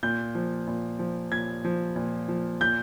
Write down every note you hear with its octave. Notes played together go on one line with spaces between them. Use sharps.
A#2 G6
F3
A#2
F3
A#2 G#6
F3
A#2
F3
A#2 G6